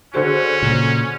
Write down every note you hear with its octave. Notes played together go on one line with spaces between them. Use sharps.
D3 C#4 F#4 G#4 C5 C#7
A#2 C#3